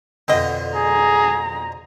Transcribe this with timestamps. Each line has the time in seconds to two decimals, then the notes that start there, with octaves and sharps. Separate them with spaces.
0.28 F2 B2 D3 C4 D#5
0.76 G#4 A#5